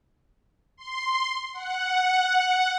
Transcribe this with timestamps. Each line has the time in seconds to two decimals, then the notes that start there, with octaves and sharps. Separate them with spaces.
0.76 C6
1.53 F#5